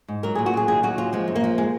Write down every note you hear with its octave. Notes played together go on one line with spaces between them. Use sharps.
G#2
F#3 A#4
G#4
A#2
F#4
F#3 G#4
D#2 G#4
F#3 F#4
D#2 F4
F3 G#3
F#2
A#3
F3
G#3